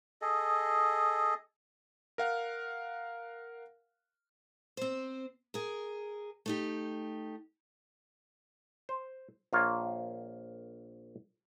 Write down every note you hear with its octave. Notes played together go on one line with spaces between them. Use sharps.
G#4 A4 D#5
A#4 F5 F#5
C4 C5
G#4 A#4
A3 D#4 G4
C5
A#1 A#3 F4 C#5